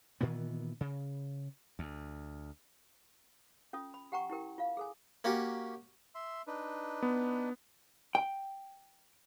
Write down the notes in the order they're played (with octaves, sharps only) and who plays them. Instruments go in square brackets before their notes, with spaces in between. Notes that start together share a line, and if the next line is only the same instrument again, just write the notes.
[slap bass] A#2 D#3 E3 B3
C#3
D2
[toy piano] C#4 F4 A4 D#6
B5
G4 F#5 G5 A#5 C#6
E4 G4 A#4 G5
F4 F5
G#4 A4 G#5
[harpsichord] A#3 C#4 F#4 G4
[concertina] E5 C6
D4 D#4 B4
[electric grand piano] B3
[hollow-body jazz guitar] G5